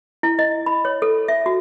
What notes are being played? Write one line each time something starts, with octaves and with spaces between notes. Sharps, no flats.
E4
D#5
B5
C#5
A4
E5
F#4